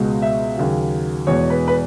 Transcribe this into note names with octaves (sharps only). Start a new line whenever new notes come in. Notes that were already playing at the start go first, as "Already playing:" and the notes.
Already playing: C#2 B2 G#3
E5
D#2 C#3 F#3
E2 B2 G#3 C#5
B4
B4